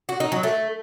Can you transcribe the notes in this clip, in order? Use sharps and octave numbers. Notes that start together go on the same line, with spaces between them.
F#4
D#4
F#3
A3